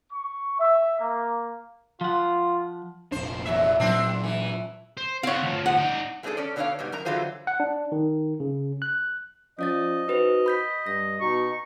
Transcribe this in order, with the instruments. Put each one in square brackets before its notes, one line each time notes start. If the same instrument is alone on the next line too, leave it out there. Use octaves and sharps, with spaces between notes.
[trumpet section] C#6
E5
A#3
[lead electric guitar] F3 F#5 [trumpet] F4
[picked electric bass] F1 A#1 D4 [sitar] C5
[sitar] E2 F#3 E5
[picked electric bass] A#2 F#3 [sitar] C4 D4 E4
[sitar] E3
[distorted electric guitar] C5
[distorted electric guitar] C4 F#5 [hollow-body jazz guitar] C#5 F5
[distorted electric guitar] D2 F3
[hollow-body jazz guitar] F#5
[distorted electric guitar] D#4 D5
[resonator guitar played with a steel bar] G#3 A3 C4 D4 G#4 A4
C#4 A4 D5
B2 D3 A3 D4 C#5 F5
G#2 B2 G3
F#2 A#4 A#5
D3 E3 F#3 F4 G#4 C5
[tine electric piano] F#5
D4
D#3
C#3
F#6
[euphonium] F3 [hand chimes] C#4 D5 A6 [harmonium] D#5
[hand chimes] D#4 B4 C5 [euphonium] F#4
[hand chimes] B5 G6 B6
[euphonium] G2 [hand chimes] A#6
[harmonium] B2 D#4 [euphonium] F#4 [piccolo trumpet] C#6